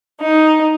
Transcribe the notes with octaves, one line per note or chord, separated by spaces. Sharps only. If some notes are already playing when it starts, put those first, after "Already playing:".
D#4